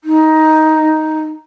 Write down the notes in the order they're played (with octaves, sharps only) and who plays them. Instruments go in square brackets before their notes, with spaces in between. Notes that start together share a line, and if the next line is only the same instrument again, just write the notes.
[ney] D#4